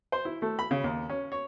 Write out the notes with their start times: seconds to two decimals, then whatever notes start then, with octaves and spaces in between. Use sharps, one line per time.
0.12 C5
0.25 E4
0.42 A3
0.59 B5
0.71 C#3
0.84 D#2
1.09 C#4
1.32 C#5